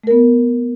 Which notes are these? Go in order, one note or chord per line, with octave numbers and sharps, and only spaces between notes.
A3 B3 A#4